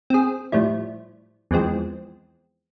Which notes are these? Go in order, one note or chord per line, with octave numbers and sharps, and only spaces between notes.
C4 G#4
A2 F3 G3 E4
E2 E3 F3 G#3 C4